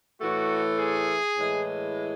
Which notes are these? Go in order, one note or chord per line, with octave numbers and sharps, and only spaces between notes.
A2 E3 A3 F#4
G#4
A2 E3 G#3